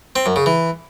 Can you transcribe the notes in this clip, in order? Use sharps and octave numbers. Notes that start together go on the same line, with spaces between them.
C4
F#2
C#3
E3